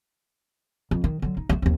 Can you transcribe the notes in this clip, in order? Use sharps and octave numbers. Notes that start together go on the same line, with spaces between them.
F2
D#3
D3 F#3
D#4
G3 A3
D#2 C4